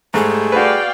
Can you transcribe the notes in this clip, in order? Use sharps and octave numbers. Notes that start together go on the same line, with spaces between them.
G#2 G3 A3 G#4
F#4 B4 D5 F5 G5